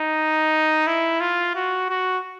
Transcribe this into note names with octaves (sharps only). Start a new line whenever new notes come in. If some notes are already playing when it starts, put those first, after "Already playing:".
Already playing: D#4
E4
F4
F#4
F#4